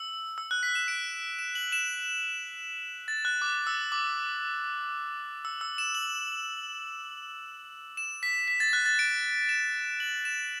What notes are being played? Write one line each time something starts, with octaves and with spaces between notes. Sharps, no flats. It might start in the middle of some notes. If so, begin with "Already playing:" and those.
Already playing: E6
E6
F#6
B6
E7
D7
E7
F#7
E7
A6
F#6
D6
E6
D6
E6
E6
E7
F#7
E7
B6
B6
A6
F#6
A6
D7
E7
F#7
E7